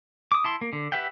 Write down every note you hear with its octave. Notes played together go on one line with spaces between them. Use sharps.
D6 D#6
E4 A5 C6
A#3
D3
G4 B4 E5 F#5 G5